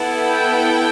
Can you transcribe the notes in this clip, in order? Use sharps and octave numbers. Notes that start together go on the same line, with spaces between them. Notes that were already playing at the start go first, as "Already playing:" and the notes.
Already playing: B3 E4 A4
G5